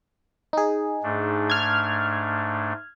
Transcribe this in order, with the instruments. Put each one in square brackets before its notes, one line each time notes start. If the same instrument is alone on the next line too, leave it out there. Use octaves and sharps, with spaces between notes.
[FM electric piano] D#4 G#4
[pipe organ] G#2 A3 D4
[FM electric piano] F6 G#6